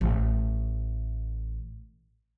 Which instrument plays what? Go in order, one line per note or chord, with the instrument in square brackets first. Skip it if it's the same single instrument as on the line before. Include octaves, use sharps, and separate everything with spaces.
[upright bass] A1 A3